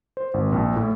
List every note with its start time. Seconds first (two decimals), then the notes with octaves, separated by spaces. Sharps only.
0.17 C5
0.34 G#1
0.52 A#1
0.76 A2